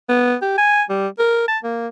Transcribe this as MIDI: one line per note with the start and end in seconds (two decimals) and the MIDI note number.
0.09 0.35 59
0.42 0.53 67
0.58 0.82 80
0.89 1.07 55
1.19 1.46 70
1.48 1.58 81
1.64 1.88 58